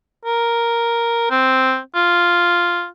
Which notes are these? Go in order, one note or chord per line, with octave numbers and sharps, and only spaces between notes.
A#4
C4
F4